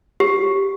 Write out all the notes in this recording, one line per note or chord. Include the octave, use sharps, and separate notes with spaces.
G4